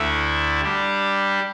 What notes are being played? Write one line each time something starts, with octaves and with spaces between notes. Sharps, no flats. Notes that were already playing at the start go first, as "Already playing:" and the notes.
Already playing: D2 D3 A3 E4
G3 D4 G4